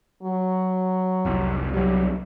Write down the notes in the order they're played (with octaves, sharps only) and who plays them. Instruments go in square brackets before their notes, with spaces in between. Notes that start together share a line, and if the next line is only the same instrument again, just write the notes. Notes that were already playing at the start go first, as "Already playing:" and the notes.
[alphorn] F#3
[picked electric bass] F1 C2
[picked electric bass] C2 F#3 [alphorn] G3